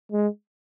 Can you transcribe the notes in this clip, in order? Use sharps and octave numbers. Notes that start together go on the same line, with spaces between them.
G#3